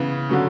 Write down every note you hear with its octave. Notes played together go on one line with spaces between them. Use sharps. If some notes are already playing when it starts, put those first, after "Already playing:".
Already playing: C#3 E3 B3
D3 F#3 C#4